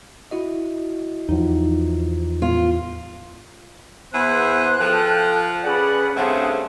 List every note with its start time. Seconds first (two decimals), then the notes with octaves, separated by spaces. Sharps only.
0.31 E4 F#4 D#5
1.29 E2 F3 D#4
2.42 A2 B3 F4
4.13 E2 B3 E4 G#4 C5 F#6
4.80 F3 A4 G5
5.64 C#4 G#4 B4 D5 F#5
6.16 G2 C#3 A3 C4 D4 G#4 C5 F#5